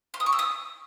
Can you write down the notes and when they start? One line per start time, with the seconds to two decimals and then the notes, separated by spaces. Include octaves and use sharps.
0.14 C6
0.20 D#6
0.26 C#6
0.32 E6
0.39 D#6